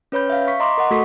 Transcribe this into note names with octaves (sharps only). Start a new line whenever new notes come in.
C#4 B4 C#5 B5 G6
E5 F5
C#6 B6
D#5 A#5 C6 D6
A#4 D#5 F#5
A3 F#4 A4 C#6 B6